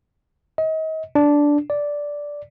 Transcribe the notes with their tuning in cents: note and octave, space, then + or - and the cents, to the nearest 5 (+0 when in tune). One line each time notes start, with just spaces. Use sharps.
D#5 +35
D4 -10
D5 -5